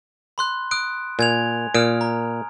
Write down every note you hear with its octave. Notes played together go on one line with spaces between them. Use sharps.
B5 C6 F#6
D#6 F#6 D7
A#2 G#5 G#6 F7
A#2 D#6 F6 D7
A#5